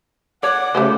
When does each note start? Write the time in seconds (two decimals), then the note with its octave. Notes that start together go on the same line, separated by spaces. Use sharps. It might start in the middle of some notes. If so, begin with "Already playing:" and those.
0.43 C#5 D5 F#5 D6
0.75 C#3 A3 G4 C5